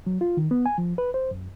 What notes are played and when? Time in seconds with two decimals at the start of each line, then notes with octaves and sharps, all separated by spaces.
0.07 F#3
0.21 F4
0.37 D#3
0.51 B3
0.66 G#5
0.78 F3
0.98 B4
1.14 C5
1.31 F#2